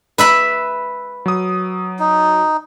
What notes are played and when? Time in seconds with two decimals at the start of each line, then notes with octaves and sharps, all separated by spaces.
0.18 B4 E5 B5
1.26 F#3 D#6
1.99 D#4